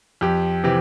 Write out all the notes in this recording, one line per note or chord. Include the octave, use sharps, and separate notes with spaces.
F2 G4
C3 E3 G4